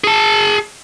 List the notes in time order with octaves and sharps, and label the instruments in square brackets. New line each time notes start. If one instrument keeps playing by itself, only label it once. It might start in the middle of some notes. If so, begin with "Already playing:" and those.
[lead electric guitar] G#4 A5